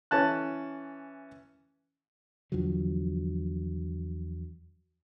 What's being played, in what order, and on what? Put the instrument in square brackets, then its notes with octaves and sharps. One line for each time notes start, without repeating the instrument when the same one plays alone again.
[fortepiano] E3 C#4 A5 F#6
[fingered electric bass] E2 D3 F3 F#3